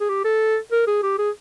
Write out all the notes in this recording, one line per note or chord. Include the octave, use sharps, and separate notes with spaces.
G#4
G4
A4
A#4
G#4
G4
G#4